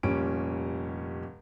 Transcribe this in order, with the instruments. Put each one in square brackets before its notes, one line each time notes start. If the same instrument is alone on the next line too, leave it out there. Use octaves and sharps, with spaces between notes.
[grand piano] F1 A#2 G3 C#4 D7